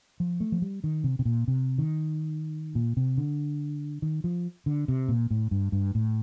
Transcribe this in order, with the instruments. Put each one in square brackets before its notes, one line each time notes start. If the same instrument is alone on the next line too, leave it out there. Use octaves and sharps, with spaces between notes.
[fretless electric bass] F3
A3
F3
G3
D#3
C3
C3
A#2
C3
D#3
A#2
C3
D3
D#3
F3
D3
C3
A#2
A2
G2
G2
A2